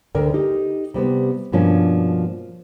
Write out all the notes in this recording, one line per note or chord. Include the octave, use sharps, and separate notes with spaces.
D2 D3 A#4 D5 G5
D#4 G4
C3 G3 B3 C5
G2 B2 F3 A#3 C#4 D4